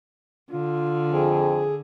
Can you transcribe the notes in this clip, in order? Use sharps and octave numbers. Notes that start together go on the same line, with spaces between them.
D3 F4
F2 G#4